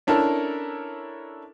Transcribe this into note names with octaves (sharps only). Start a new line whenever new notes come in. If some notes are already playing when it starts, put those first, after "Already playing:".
C#4 D4 E4 A4 A#4